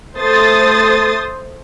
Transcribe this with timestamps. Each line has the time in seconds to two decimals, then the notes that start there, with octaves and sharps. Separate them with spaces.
0.17 A3 C5 C6 D#6 A6